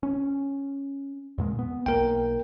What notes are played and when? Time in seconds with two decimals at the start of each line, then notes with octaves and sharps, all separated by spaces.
0.03 C#4
1.38 F2 A#2 G#3
1.59 B3
1.86 B1 A#3 A#4 G5